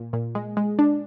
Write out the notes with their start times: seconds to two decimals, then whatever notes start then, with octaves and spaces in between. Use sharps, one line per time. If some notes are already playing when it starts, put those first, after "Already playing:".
Already playing: A#2
0.13 A#2
0.35 G#3
0.57 G#3
0.79 D4